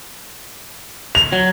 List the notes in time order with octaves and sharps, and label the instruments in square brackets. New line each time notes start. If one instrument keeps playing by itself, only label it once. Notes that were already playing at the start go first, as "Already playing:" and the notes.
[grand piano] F7
[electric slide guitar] F#3